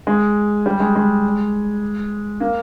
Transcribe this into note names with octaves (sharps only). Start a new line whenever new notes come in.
G#3
G3
G#3
G#3
A#3